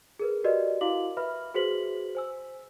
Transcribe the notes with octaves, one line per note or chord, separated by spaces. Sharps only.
G#4 A#4 B4
F#4 G4 A#4 B4 D5 D#5
E4 F#4 F5 D6 F#7
B4 E5 B5 F6
F#4 G#4 B4 C5 B6 F#7
C5 G#5 E6